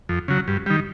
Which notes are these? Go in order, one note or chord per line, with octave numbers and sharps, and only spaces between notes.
F2
C#3 F#3
G2
D#3 G3